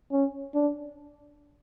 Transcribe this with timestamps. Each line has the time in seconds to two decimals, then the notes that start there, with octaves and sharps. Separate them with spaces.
0.12 C#4
0.54 D4